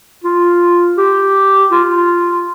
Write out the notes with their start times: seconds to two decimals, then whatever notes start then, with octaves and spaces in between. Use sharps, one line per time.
0.24 F4
0.98 G4
1.72 F4